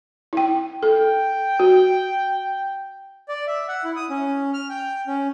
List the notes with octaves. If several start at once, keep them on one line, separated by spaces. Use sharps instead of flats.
E4 G5
A4 G5
F#4
D5
E5
F#5
E4
D#6
C#4
F6
G5
C#4